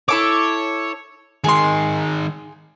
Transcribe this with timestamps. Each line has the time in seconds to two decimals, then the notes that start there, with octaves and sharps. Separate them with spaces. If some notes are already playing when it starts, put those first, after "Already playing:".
0.09 E4 A4 C#5 D6
1.44 D#3 G#3 G#4 C6